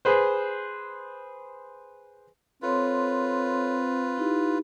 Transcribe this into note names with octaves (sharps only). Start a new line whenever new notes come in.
G#4 B4 C5
C4 F4 A4 B4 C#5 C6
D#4 E4 G4